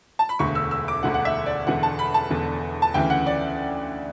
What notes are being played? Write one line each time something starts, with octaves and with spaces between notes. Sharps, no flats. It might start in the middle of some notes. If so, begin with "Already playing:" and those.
A5
B5
E1 D2 D3 C#6
E6
E6
D6
E1 D2 D3 F#5
F#5
E5
D5
E1 E2 D3 F#5
A5
B5
A5
E1 E2 D3
A5
D2 C#3 E3 G5
F#5
D5